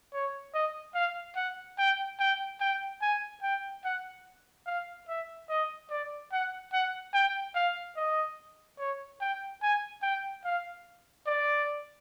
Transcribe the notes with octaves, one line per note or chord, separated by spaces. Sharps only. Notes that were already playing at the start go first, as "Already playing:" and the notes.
C#5
D#5
F5
F#5
G5
G5
G5
G#5
G5
F#5
F5
E5
D#5
D5
F#5
F#5
G5
F5
D#5
C#5
G5
G#5
G5
F5
D5